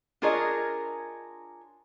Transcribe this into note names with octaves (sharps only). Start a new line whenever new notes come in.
D4 F4 G#4 A#4 C#5 D#5